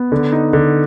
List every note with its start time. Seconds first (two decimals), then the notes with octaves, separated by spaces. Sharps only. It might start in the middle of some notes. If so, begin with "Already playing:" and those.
Already playing: B3
0.12 D3
0.32 D#4
0.53 D3